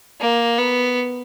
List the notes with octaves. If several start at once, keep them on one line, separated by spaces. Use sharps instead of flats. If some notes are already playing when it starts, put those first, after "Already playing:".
A#3
B3